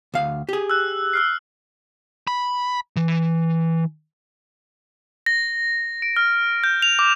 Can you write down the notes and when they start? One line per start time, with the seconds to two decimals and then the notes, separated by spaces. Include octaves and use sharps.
0.14 D2 F5
0.49 G4 G#4
0.70 E6 F#6
1.13 E6 F6 C7
2.27 B5
2.96 E3
5.26 A#6
6.02 D7
6.17 F6
6.64 G6
6.82 F7
6.99 D6